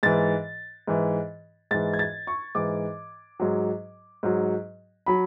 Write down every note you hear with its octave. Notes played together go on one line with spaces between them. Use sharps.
G#2 E3 A6
G#2 E3
G#2 E3 A6
G#6
A6
C#6
G#2 E3 D6
G#2 F#3
G#2 F#3
F#3 B5